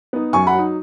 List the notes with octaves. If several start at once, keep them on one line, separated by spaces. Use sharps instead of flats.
B3 D#4
F#2 G#5 C#6
F#5 B5
F#3 D#4